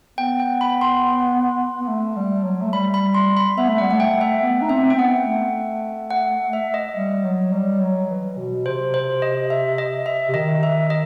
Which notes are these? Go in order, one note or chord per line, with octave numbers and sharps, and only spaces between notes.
B3 G5
G5
B5
C6
B3
A3
G3
F#3
A3
G3 B5
B5
C6
B5
B3 E5
A3
G3 F#5
A3 F#5
G5
E5
B3
D#4
C4 E5
G5
C4
B3 F#5
A3
F#5
E5
D#5
G3
F#3
G3
F#3
E3
B2
C3 C5
C5
D#5
E5
D#5
E5
C3
D#3 D#5
E5
D#5